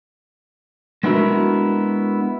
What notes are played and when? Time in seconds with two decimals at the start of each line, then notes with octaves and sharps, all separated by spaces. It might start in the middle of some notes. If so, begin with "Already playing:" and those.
1.03 G#3 B3 D4 E4 F#4 A#4